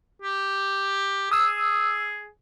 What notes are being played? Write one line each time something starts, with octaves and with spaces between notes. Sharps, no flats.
G4
G#4 D#6 E6